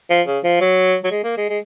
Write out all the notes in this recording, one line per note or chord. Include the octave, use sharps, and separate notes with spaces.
F3
C#3
F3
F#3
F#3
G#3
A#3
G#3
G#3